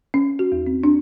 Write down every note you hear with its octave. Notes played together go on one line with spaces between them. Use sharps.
C#4
F#4
E2
C4
D4